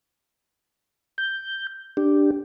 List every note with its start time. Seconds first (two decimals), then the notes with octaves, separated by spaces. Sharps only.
1.18 G6
1.97 D4 G4